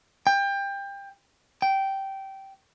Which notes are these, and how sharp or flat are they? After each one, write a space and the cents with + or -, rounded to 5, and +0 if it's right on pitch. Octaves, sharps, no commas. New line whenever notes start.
G5 +25
G5 -15